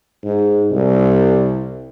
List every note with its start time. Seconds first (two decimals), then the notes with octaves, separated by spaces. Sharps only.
0.24 G#2
0.72 C2